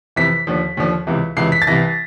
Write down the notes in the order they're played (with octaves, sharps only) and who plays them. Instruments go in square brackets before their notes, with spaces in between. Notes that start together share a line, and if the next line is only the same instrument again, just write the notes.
[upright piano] F2 C3 E3 B6
D#2 D3 F3
D#2 D3 F3
C#2 C3 E3
C#2 C3 E3 C7
B6
A6
C2 C3 E3 A#6